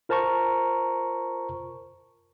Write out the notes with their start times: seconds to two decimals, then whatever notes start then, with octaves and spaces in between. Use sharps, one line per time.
0.09 F4 A#4 C5 A5 A#5 C#6